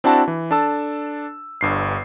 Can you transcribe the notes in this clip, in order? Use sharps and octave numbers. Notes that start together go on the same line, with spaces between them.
C4 D4 E4 F#4 A5
E3
D4 A4 A5 E6
G1 G2 C7